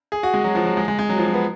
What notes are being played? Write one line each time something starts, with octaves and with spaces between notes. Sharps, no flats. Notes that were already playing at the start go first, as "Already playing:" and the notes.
G#4
F#4
G#3
F#3
F3
F#3
G#3
G#3
G#3
F#3
F3
F#3
B3